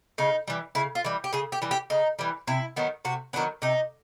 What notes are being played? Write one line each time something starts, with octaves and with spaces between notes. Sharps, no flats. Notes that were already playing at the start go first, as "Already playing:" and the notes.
C#3 D#4
E3 G3
C#3 E4
F4
E3 G3
G4
C#3 G#4
G4
E3 G3
G4
C#3 D#4
E3 G3
C3 E4
D#3 F#3 B3
C3 F#4
D#3 F#3 B3 D4
C3 D#4